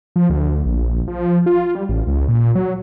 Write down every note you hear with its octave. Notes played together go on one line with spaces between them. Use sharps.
F3
D2
A#1
F3
F4
G3
A1
C#2
A#2
F#3